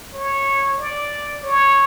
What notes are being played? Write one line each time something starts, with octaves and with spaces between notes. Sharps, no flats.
C#5
D5
C#5